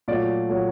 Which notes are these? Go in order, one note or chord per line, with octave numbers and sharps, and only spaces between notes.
A#2 F#3 A3 D5
A#2 F#3 A3